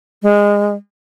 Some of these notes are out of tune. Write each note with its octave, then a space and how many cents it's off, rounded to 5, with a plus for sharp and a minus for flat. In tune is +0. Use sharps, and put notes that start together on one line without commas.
G#3 -20